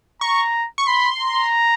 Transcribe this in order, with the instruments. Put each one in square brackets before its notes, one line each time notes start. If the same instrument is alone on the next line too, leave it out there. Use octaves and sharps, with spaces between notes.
[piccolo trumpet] A#5 [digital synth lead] C#6
[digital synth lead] C#6
[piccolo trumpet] B5 [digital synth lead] C6
[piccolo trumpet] A#5